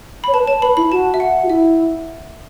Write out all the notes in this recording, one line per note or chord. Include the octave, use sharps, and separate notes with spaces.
C#5 B5
B4 A5
C#5 A5
B4 B5
E4 B5
F#4 A5
E5
F#5
F#4
E4 E5